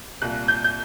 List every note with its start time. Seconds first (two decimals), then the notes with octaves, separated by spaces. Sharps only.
0.22 C2 A#2 F#6
0.48 G6
0.64 G6